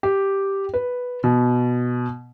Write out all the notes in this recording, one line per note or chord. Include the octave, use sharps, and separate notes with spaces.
G4
B4
B2